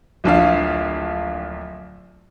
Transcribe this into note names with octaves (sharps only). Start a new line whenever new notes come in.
D1 A#1 D4 F5